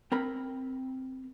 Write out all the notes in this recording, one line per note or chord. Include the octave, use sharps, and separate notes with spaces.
C4 A#4 B5